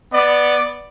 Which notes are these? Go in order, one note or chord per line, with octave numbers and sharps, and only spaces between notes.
B3 D5